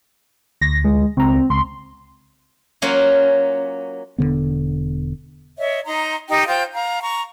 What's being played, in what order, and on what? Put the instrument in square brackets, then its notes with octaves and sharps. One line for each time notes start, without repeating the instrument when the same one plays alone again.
[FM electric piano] D2 [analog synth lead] A#6
[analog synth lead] G#3
[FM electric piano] C#2 A#5 [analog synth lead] C4
[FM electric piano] C#2 [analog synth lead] C6
[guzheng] F#3 A#3 C#4 F4 F#4
[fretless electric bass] E1 F2 D3 B3
[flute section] C#5 D#5 E5
D#4 A#5 C6
D#4 G4 G5
F4 C5 G5 G6
F5 A#5
A#5 C#6